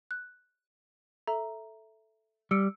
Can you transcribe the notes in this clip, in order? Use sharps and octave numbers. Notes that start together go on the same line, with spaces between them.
F#6
A4 E5 A#5
G3 E6 C#7 D7